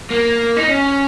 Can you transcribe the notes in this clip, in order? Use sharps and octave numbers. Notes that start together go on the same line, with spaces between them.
A#3
D#4
C#4